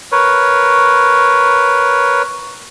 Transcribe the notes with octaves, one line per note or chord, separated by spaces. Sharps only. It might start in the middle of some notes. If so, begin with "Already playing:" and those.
A#4 B4 C#5